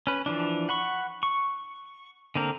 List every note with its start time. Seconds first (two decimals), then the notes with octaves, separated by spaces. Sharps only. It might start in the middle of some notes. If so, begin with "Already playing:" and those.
0.07 C#4 B4
0.26 E3 F3 D4
0.69 F#5 B5 C#6
1.23 C#6
2.35 D3 A#3 C4 A#4